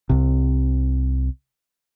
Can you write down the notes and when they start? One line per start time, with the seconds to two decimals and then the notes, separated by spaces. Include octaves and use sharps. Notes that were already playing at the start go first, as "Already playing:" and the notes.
0.09 C2 C3